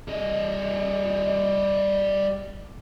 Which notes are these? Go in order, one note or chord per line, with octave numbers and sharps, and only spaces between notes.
G3 D#5